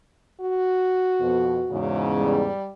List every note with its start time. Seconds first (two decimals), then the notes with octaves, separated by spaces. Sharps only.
0.41 F#4
1.21 F2 B2
1.71 E2 G#2 C#3
2.20 G3